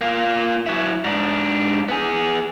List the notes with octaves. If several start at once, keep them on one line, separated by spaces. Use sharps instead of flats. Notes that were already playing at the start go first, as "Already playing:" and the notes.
A#3 F4
F#3 E4
G#2 D4
B3 G#4